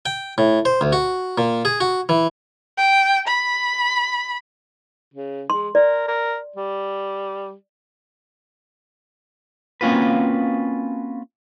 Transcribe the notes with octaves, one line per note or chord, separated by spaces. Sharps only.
G5
A2
C5
D2
F#4
A#2
G#4
F#4
E3
G5
B5
C#3
G#3 C6
A#4 D5
A#4
G3
A#3 C4 C#4 F4 F#4 B4